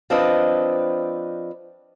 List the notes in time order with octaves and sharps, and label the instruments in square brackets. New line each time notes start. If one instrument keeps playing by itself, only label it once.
[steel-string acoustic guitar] F3 C4 D4 B4 D#5